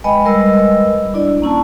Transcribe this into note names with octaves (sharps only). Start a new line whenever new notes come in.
G#3 B4 D#5 G5 G#5 B5
G3 G#3 A#4 B4 D#5 E6
D4 E4 D5
A#3 C#4 E4 A5